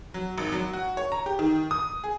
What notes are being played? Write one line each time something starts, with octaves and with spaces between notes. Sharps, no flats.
F#3
G#1
F#3
F#4
C#5
A#5
G4
D#3
D#6
G#4